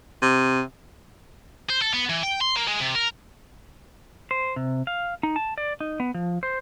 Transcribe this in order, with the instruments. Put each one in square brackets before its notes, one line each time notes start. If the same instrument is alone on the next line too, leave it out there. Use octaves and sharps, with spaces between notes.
[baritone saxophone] C3
[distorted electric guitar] C5
A4
B3
E3
G5
C6
A#3
G#3
C3
A#4
[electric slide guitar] C5
C3
F5
D#4
A5
D5
D#4
B3
F3
C5